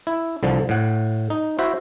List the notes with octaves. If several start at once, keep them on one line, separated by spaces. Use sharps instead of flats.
E4
C2 D3 F3
A2 F#5
D#4
E4 F#4 C5 E5